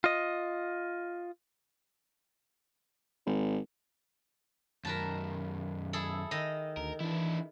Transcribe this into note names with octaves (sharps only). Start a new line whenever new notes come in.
F4 D#5
G#1
F#2 D#3 A#4 B4 A5
E4 G#4 A4
D#3 D#5
D2 A#4
E3 D4 E4